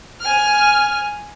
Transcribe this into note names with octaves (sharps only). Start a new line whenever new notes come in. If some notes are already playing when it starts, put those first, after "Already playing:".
G#5 F6